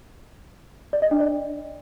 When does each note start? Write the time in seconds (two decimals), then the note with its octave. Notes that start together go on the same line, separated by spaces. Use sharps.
0.93 D5
1.02 D#5
1.11 D4
1.20 D5